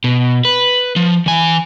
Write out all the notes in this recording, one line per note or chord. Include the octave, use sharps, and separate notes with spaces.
B2
B4
F3
E3 G#5